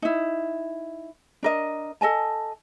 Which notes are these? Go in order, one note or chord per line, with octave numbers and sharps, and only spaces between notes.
D#4 E4
D4 A#4 D#5
A4 D#5 G#5 A5